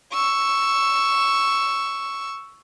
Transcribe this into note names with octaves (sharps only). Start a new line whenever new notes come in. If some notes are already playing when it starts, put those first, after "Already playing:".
C#6 E6